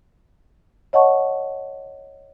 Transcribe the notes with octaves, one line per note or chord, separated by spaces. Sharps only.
C#5 D#5 F#5 A5 C#6